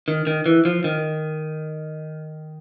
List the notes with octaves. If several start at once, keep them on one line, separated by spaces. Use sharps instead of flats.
D#3
D#3
E3
F3
D#3